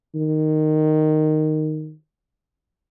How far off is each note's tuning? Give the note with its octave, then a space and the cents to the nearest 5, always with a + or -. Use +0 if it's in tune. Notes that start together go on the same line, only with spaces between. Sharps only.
D#3 -10